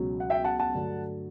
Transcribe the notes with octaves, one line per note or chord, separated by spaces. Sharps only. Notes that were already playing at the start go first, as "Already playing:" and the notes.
Already playing: C#2 B2 F#3
F#5
E5 G5
F#5 A5
F#5 A5
G2 D3 F#3 A3